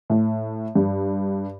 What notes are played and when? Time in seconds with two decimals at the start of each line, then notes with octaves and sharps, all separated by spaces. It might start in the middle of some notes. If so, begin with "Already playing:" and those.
0.10 A2
0.75 G2